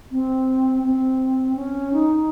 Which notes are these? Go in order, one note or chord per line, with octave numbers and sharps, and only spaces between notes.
C4
C4
C#4
D#4